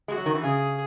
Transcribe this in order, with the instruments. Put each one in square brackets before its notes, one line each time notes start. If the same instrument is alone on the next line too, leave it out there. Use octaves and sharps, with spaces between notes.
[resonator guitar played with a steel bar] G#3 [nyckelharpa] F#4
[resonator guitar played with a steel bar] F#3
D#3
E3
[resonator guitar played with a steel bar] C#3 [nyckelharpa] G#4